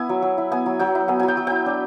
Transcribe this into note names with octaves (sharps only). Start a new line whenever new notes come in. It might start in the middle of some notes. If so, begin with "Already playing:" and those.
Already playing: B3 E4 G#5
F#3
F#3
E4
B3 G#5
F#3
F#3 G5
E4
B3 G#5
F#3 G#5
G5
F#3
E4 G5
D4